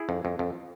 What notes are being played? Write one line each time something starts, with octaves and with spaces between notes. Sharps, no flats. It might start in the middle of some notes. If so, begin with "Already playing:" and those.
Already playing: E4 G#4
F2
F2
F2